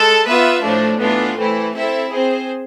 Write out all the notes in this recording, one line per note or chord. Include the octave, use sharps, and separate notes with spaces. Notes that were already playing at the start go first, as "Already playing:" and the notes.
Already playing: G#3 A4
B3 F4 B4 E5
A2 F3 A3 D4
A2 E3 B3 D4 F4
E3 A3 C4 E4
C4 E4 A4 E5
C4 G#4 C5